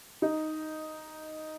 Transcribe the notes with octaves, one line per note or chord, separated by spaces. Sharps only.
D#4